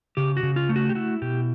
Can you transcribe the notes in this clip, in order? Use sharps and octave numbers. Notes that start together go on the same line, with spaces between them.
C#3 G4
F#4
C#3
F4
A3
F#4
G4
E4 F#4
B2 G4